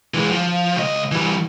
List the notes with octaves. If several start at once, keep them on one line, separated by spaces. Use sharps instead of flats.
E3 G#3
F3
C#2 D#5
E3 G3